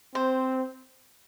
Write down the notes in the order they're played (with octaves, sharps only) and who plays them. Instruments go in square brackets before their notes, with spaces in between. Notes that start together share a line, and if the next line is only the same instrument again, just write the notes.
[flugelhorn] C4 [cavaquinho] C5